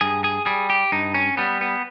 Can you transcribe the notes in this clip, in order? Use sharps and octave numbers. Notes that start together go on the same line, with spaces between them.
G2 G#4
G#4
G3 G#4
G4
G2 D#4
C#4
G3 B3
B3